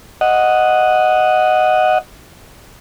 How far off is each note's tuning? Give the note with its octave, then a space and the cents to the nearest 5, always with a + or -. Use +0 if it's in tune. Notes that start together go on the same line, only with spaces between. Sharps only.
D#5 +0 F#5 +0